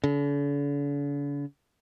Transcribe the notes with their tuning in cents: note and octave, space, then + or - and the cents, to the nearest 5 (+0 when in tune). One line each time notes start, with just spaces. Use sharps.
D3 -45